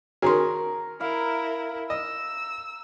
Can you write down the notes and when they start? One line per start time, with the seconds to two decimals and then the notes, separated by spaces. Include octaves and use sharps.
0.22 D#3 C#4 F#4 G#4 A#4 A#5 C6
1.01 E4 A#4 F5
1.90 D#5 E6